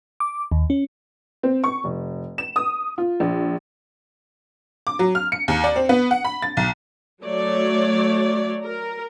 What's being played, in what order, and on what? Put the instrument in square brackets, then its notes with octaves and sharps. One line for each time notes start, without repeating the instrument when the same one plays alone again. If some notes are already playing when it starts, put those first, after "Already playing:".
[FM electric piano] D6
D#2
C#4
[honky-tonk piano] C4
C#6
F1
E7
D#6
F4
A#1
D6
F#3
F6
C#7
D#2
D5
C4
B3
F#5
B5
A6
B1
[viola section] F#3 A3 C#5 D5
A#4